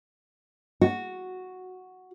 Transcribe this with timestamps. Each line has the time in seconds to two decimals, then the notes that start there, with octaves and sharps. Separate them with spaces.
0.82 F#4